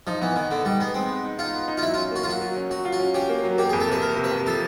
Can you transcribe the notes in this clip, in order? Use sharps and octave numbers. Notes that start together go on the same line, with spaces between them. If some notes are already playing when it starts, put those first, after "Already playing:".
F3 D#4
E3 B3
D#3 B3
D3 B3
G3 D#4
G#3 B3
G#3 C4
B3
D#4
D#4 F4
B3
D#4
F4
F#3 E4
F4
C#4
A#3 F#4
F4
F#3 F#4
F#3
C#4
F#3 F#4
F4
F#4
C#4
C#4 G4
A#3
F#3
A#3 G4
G#4
F2
A4
C3 B4
A#3 A#4
C3
B4
C3
F3 A4